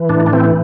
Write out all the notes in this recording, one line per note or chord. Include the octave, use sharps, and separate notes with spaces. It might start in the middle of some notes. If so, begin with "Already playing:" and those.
Already playing: E3
A2 D4
D4
E3 C4